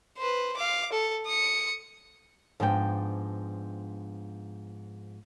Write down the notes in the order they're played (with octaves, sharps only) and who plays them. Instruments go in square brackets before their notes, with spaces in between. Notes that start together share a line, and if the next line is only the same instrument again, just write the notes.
[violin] B4 C5
F5 D6
A4
D#6 C#7
[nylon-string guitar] G#2 F3 B3 D4 G#4 G5